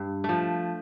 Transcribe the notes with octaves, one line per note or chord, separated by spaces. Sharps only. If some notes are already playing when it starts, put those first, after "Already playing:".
Already playing: G2
F3 A3